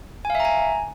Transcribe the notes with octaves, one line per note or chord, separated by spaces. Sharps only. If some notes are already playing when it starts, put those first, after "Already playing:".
G#5
F5
E5
A#5
G#5